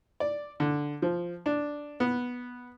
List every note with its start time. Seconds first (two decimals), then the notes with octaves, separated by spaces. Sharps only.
0.20 D5
0.60 D3
1.02 F3
1.46 D4
2.00 B3